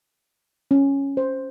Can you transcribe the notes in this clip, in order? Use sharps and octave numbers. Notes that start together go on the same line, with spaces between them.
C#4
C5